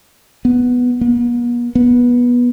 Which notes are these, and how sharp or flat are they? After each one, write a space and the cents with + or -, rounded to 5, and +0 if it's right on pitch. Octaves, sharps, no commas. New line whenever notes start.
B3 +0
B3 -45
B3 -20